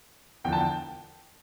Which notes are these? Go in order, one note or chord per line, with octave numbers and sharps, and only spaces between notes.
E1 E2 D3 F3 G5
A5
G5